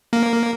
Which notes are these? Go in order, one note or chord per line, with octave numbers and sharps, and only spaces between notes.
A#3